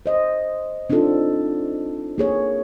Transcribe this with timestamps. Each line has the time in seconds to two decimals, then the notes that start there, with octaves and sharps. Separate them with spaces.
0.06 C5 D#5
0.90 C4 D4 D#4 F4 A4
2.18 A#3 G#4 C#5